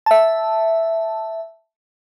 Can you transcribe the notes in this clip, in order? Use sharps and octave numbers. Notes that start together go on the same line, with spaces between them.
E5 A5